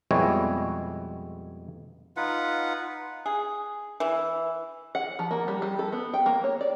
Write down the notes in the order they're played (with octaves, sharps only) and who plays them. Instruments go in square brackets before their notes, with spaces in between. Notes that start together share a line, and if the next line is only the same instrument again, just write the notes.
[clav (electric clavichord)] F2 B2 G3 G#3 E4 C#5
[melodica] D#4 F4 B4 F#5
[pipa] G#4
E3
[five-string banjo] F#5
F3
A#3
G3
G3
A4
B3
G5
A#3
C#5
D5